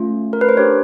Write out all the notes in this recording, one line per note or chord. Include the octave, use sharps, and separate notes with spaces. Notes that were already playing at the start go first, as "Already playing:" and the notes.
Already playing: A3 C#4 F4
A#4
B4
C5
D4 G4 C#5